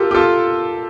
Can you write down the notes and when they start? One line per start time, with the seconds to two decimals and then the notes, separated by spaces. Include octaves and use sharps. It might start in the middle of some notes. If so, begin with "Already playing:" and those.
Already playing: F4 G4 A4 A#4
0.11 G4
0.15 F4 A4